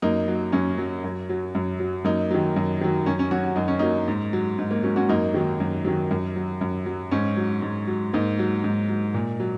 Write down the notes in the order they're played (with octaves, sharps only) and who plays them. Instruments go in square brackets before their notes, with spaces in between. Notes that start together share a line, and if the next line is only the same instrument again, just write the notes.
[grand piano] F#2 A#3 D#4
F#3
F#2 C#4
F#3
F#2
F#3
F#2
F#3
F#2 A#3 D#4
D#3 F#3
F#2
D#3 F#3
F#2 C#4
C#4
F#3 C#4 F#4
F#4
F#2 D#4
C#4
F#3 A#3 D#4
G#2
F#3
G#2
A#3
F#3 C#4
C#4 F#4
F#2 A#3 D#4
D#3 F#3
F#2
D#3 F#3
F#2
F#3
F#2
F#3
G#2 C#4
F#3
G#2
F#3
G#2 A#3 D#4
F#3
G#2
F#3
A#2
F#3